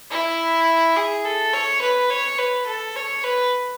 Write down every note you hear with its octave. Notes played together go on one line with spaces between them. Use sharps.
E4
G#4
A4
C#5
B4
C#5
B4
A4
C#5
B4